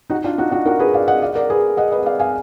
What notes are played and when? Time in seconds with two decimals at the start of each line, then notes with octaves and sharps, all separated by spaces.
0.10 D#4 F#4
0.24 D4 F4
0.38 D#4 F#4
0.51 D#4 F#4
0.65 F#4 A#4
0.79 G#4 B4
0.94 D5 F5
1.08 D#5 F#5
1.22 D5 F5
1.35 A#4 D5
1.50 G#4 B4
1.77 D#5 F#5
1.92 B4 D#5
2.06 D5 F5
2.19 F5 G#5